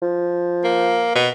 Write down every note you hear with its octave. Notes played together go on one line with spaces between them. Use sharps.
F3
A#3
B2